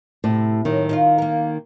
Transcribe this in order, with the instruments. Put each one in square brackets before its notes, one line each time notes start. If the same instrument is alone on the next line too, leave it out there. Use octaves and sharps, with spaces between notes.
[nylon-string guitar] A2 [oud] C3
[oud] A2 F#3 [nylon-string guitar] D#3
[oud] C4 D#4 F4
A#3 A#4